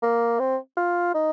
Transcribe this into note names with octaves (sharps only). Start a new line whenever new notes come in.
A#3
C4
F4
D#4